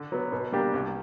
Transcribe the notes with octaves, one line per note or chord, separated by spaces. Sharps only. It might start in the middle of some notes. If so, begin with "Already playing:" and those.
Already playing: D3
F#3 B3
B2
G3 A#3 D4 G4
C2